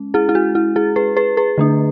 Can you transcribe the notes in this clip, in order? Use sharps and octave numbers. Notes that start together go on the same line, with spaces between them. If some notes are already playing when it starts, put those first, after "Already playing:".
Already playing: G#3 C#4
E4 G#4
E4
F#4
E4
E4 G#4
G#4 B4
G#4 B4
G#4 B4
D3 A3 D4